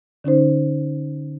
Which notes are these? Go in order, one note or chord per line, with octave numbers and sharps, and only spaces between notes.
D3 C#4 D#4 C5